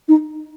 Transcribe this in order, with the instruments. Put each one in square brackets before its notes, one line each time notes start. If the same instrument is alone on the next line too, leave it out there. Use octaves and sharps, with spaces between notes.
[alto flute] D#4